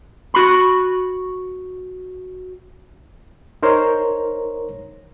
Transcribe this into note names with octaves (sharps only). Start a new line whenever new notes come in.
F#4 B5
D#4 A#4 C5 C#5